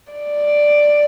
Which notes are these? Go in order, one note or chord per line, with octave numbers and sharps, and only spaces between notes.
D5